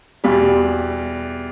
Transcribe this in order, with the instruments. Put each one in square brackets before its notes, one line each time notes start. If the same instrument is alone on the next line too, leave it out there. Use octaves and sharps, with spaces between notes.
[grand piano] E2 B2 G3